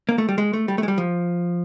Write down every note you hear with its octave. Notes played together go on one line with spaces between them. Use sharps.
A#3
A3
G3
G#3
A3
G3
A3
G#3
G3
F3